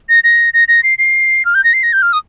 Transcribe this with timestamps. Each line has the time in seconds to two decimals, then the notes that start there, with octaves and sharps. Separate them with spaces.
0.09 A#6
0.24 A#6
0.54 A#6
0.68 A#6
0.83 C7
0.98 C7
1.45 F6
1.55 G6
1.64 A#6
1.73 C7
1.83 A#6
1.93 G6
2.02 F6
2.13 D#6